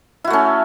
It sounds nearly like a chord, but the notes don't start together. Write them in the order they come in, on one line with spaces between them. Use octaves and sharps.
E4 F#4 A3 C#4